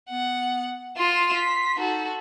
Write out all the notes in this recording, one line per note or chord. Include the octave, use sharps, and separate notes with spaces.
B3 F#5
F4 C6 E7
B6
D#4 F#4 A4